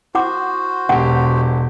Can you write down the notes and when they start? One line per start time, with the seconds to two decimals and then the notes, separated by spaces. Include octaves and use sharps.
0.15 E4 F#4 C5 F#5 D6
0.89 E1 B2 G4 F#5